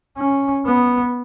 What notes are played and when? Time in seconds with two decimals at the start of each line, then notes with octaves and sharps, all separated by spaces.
0.17 C#4
0.66 B3